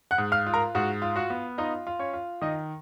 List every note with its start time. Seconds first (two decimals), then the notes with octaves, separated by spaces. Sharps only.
0.11 F#5 F#6
0.18 G#2
0.32 F5 F6
0.47 F4
0.54 A#4 A#5
0.75 G#2 F#4 F#5
1.02 F4
1.16 F#4 F#5
1.30 B3
1.58 D#4 F4 D#5
1.87 F4
1.99 C#4 C#5
2.13 F4
2.42 D#3 D#4 D#5